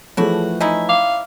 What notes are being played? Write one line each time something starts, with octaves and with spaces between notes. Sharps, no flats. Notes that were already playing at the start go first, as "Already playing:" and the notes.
E3 F3 A3 E4 F#4 G#4 A4 C#5
C#4 D#4 E4 D#5 G#5
F5 D6